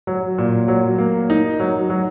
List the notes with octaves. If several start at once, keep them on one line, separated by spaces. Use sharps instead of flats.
F#3
A#2
F#3
A#3
D#4
F#3
F#3